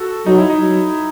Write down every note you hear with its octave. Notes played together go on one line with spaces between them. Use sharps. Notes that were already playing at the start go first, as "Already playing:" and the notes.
Already playing: F#4 A4
F#3 D#4
E4
D#4
F#3